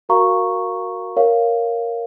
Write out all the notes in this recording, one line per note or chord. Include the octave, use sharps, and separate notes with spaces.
F#4 A#4 F5 A#5 C#6
A#4 C#5 F5